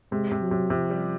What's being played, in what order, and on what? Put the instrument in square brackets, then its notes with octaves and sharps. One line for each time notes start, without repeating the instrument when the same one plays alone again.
[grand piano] C3 [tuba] G#3
[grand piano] C3
[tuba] F#3
[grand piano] C3
[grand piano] C3 [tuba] F3
[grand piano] G3